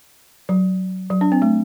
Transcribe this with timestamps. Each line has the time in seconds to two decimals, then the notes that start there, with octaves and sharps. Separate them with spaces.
0.49 F#3
1.10 F#3
1.21 D4
1.32 C4
1.42 A3